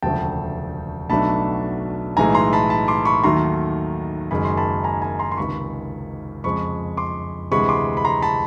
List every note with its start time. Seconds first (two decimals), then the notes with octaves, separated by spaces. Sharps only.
0.03 E1 D2 C#3 F3 A3 G5 A5
1.09 B1 B2 F#3 A3 D4 A5 B5
2.17 B1 A2 E3 G#3 G#5 A#5
2.35 A#5 C6
2.53 A5 B5
2.70 A5 B5
2.88 C6 D6
3.05 B5 C#6
3.24 D#2 D#3 F#3 A3 A#5 C6
4.31 F#1 F#2 D#3 G#3 B5
4.45 C6
4.57 A5 B5
4.84 G#5 A#5
5.02 G#5 A#5
5.19 A#5 C6
5.32 C6
5.37 C#2 C3 D#3 B5 C#6
6.44 F2 C#3 F3 G#3 B5 C#6
6.97 C6 D6
7.51 D2 C3 E3 G#3 B5 C#6
7.69 C6 D6
7.97 B5
8.05 A#5 C6
8.22 A5 B5